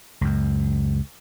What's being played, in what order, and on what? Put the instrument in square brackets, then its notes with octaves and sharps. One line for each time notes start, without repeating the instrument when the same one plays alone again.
[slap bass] C#2 F#2